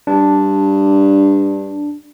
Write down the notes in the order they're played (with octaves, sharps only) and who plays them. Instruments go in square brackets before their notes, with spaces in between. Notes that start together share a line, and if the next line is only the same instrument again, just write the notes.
[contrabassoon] G2 [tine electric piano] D4